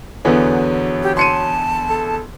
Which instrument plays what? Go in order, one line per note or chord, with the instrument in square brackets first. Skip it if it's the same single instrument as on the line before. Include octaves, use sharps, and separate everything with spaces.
[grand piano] E2 D3 E3 [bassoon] F#3 [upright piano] B3
[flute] G4
[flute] A5 [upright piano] C6 C#7 D#7
[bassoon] A4